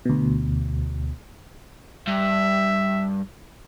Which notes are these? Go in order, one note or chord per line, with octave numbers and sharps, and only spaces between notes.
D2 B2
G2 E5